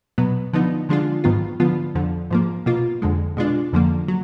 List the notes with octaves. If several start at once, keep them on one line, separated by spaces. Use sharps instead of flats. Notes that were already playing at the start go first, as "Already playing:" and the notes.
B2 F#3 B3
D3 F3 B3 D#4
D3 F3 G#3 D4 F4
G#2 D#3 F#3 B3 F4
D3 F3 B3 F4
F2 D3 F3
G#2 F3 A#3
B2 A#3 F4
F2 D3 G#3
B2 G#3 D4 F4
F2 D3 F3 A#3
F#3